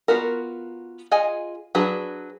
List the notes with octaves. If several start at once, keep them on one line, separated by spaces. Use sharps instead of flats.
B3 F4 F#4 A#4
F4 G#4 D#5 F#5 G#5
F#3 D4 F#4 G#4 B4